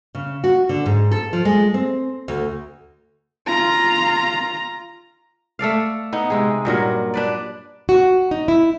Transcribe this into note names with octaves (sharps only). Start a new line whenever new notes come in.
C#3
F#4
D3
G#2
A4
F3
G#3
C4
D2
F4 A#5
A3 A4 D5 F5
B3 D#4
C3 G#3 G#4
G2 A#2 F#3 A#4
D4 B4 D5
F#4
D#4
E4